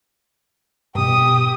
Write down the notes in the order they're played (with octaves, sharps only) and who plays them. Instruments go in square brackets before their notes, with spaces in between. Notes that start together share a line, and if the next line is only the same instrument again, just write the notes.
[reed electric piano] G2 B2 [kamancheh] G4 D#6